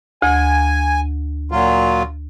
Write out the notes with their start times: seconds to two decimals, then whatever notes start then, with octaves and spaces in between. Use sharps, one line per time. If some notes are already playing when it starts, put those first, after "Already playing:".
0.22 D2 G#5
1.51 A#2 F#3 F4